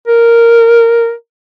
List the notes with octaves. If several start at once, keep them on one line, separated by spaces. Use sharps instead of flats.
A#4